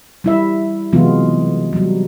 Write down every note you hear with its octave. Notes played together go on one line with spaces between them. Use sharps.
G3 E4 E5
C3 E3 F#3 G#3 B3 F4
F#3 G3